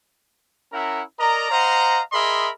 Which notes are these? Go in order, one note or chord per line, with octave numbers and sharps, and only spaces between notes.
C#4 E4 A#4 E5 F#5 A#5
A#4 D5 D#5 A#5
C5 D#5 F5 F#5 A#5
G#4 A#4 D#5 E5 B5 C6